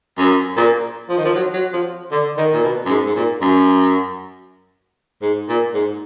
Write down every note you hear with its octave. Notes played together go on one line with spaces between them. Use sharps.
F#2
A#2
F3
D#3
F3
F#3
F#3
F3
D3
D#3
A#2
B2
F#2
G#2
G#2
A#2
F#2
G#2
A#2
G#2